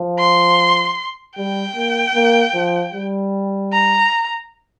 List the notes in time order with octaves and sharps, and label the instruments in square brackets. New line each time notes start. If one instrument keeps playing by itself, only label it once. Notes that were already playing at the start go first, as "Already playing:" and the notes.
Already playing: [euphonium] F3
[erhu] C6
[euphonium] G3 [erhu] G5
[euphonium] A#3
A#3
F3
G3
[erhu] A#5